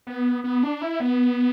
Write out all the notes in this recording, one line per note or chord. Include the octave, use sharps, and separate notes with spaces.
B3
B3
D4
E4
B3